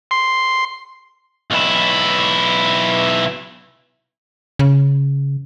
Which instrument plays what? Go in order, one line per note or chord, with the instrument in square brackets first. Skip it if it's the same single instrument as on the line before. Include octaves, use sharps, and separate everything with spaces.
[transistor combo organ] C6
[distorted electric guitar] B1 E4
[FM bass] C#3